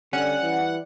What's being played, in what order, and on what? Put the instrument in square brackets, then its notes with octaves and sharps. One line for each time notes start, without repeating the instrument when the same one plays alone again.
[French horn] D3 [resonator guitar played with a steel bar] G3 [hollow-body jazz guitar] C#4 [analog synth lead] F#5
[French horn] E3